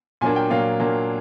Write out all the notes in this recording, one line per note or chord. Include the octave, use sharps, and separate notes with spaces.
A#2 F#3 A#3 D4 G#5
G5
A#2 F#3 A#3 D4 F5
A#2 F#3 A#3 D4